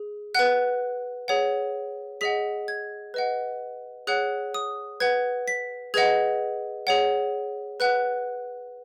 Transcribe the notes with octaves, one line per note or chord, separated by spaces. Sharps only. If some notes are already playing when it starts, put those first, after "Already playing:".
Already playing: G#4
B4 F#5 F#6
G#4 C#5 F#5
G#4 D#5 F#5 B6
G#6
B4 D#5 F#5
G#4 C#5 F#5 F#6
D#6
B4 F#5 G#6
B6
G#4 B4 D#5 F#5 G#6
G#4 C#5 F#5
B4 F#5 F#6